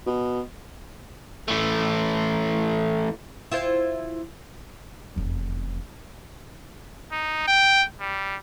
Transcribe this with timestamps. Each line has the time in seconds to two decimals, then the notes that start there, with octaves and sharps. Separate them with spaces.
0.06 B2
1.48 E3 A3
3.51 E4 F4 C5
5.16 F1 E2
7.12 D#4
7.47 G5
8.00 G3